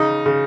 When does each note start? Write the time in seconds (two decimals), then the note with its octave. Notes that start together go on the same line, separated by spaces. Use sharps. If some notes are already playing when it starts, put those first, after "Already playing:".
Already playing: C#3 D#4
0.26 C#3